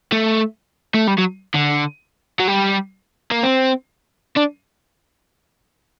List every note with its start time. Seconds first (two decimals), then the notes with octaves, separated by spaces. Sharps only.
0.12 A3
0.95 A3
1.07 G3
1.18 F#3
1.54 D3
2.40 F#3
2.48 G3
3.31 A#3
3.43 C4
4.37 D4